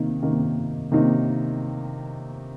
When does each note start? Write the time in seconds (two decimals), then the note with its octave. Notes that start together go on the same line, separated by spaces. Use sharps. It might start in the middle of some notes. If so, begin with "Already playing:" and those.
Already playing: C3 D#3 A#3 D#4
0.22 C3 D#3 A#3 D#4
0.92 C3 D#3 A#3 D#4